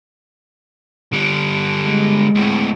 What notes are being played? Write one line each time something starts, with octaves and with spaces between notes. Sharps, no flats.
D3 G3
G#3
D2 A2